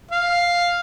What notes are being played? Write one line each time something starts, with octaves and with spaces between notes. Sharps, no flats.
F5